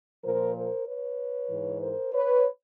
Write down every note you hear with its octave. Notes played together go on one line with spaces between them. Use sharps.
A#2 F3 A#4 C5
A#4 C5
B4 C#5
G#2 E3
A#4 C5
B4 C#5